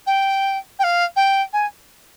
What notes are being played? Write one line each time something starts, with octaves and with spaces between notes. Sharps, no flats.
G5
G5
F5
G5
G#5